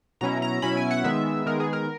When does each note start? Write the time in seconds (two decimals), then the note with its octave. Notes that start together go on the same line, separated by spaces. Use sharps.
0.21 B2 F#3 C#4 E4 A#5
0.42 A#5
0.62 B2 F#3 C#4 E4 B5
0.77 G#5
0.91 F#5
1.04 D#3 G#3 B3 E5
1.46 D#3 G#3 B3 A#4
1.60 G#4
1.73 A#4